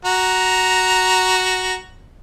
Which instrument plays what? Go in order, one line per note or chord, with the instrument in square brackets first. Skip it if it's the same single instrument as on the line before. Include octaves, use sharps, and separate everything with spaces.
[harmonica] F#4 A#5